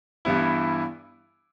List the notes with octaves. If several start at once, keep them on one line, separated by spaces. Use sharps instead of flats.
G2 E3 G3 B3 E4